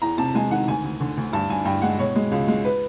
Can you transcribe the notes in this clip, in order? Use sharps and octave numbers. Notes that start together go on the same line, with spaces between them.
E2 A#5
C3 A5
G#3 G#5
D#3 F#5
D2 G#5
D2
D3
D2
G2 A5
G2 G#5
G2 G5
G#3 F#5
B2 C#5
G#3
C#2
G#3
B4